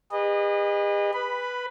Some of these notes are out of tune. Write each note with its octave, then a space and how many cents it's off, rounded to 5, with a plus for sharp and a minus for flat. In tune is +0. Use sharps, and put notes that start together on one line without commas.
G#4 -45 B4 -15 D#5 -25
B4 +0 B5 +15